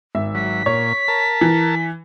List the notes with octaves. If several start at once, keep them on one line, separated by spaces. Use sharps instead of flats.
G#1 E5
F#3 B6
A#2 C#5
A#4 A5
E3